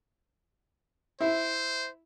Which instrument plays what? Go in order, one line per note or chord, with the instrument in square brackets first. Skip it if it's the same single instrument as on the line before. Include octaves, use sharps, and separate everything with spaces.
[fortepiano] E4 [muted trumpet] C5